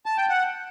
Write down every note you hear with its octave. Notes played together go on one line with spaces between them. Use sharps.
A5
G5
F#5